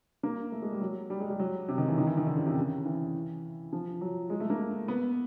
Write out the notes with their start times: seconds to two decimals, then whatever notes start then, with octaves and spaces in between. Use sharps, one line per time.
0.23 A#3
0.52 A3
0.62 G#3
0.72 G3
0.81 F#3
1.10 G3
1.20 G#3
1.30 G3
1.40 F#3
1.68 C3
1.78 D#3
1.88 E3
1.98 D#3
2.07 E3
2.17 D#3
2.26 D3
2.37 C#3
2.46 C3
2.56 C#3
2.85 E3
3.73 F3
4.01 F#3
4.30 G#3
4.40 A3
4.50 A#3
4.88 B3